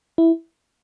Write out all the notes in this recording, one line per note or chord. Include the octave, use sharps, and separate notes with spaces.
E4